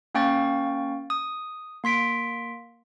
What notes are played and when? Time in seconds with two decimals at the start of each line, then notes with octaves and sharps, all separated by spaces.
0.15 A#3 C#4 F5 G5 C#6 A6
1.10 D#6
1.84 A#3 C6 B6 D7